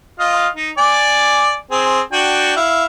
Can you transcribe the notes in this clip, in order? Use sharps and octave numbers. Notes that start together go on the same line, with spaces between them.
F4 D#5 F5
D#4
D5 G#5 D6
C4 G#4
D4 F#4 G5
E4 F5